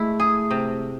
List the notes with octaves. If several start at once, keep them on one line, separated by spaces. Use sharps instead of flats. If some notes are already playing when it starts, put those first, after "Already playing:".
Already playing: G#3 A3 E4
G#4
C3